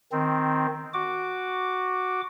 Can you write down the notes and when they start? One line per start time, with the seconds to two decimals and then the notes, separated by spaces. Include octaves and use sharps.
0.12 D#3 C4
0.94 F#4 D6